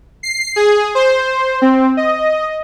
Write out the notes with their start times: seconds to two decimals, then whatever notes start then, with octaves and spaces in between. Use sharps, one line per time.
0.23 C7
0.56 G#4
0.95 C5
1.62 C4
1.97 D#5